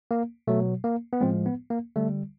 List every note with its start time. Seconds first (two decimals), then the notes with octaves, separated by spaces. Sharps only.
0.11 A#3
0.47 B2 F#3 A3
0.84 A#3
1.13 B3
1.21 A2 F3 G#3 C4
1.46 B3
1.70 A#3
1.96 D3 G3 A3